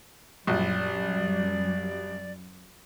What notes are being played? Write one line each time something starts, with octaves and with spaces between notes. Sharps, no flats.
A#1 F#2 F#3 G3 D5